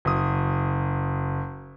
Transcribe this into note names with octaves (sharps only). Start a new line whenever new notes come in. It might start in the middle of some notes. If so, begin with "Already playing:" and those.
F#1 D#6